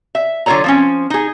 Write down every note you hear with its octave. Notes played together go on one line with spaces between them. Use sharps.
E5
D3 F#3 F4 A4 C#5 A#5
F3 C4 C#4
D#4 G#4